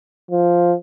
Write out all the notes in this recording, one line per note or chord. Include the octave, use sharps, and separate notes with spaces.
F3